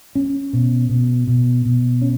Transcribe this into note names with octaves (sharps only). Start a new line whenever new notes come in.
C#4
B2
B2
B2
B2
C#4